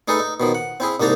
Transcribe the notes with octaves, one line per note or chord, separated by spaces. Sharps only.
A3 D#4 G#4 A4 B4 E5
D#4
B2 D#3 F3
F#5
C4 E4 G#4
C2 G#2 A#3 D#4 A5 A#5